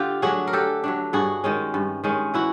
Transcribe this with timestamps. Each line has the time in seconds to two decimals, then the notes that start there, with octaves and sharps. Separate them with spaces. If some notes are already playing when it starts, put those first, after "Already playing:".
Already playing: D3 F4 G4
0.22 F#3 A3 D4 F#4 G#4
0.47 A#4
0.53 D3 G4 A4
0.84 F#3 A3 D4
1.13 G2 F#4 G#4
1.44 D#3 G#3 C#4
1.74 G2
2.04 D#3 G#3 C#4
2.34 E3 E4 F#4